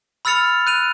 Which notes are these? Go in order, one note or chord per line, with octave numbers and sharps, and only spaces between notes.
B5 E6 F6 A6 C#7 F7
F#6 D#7 F7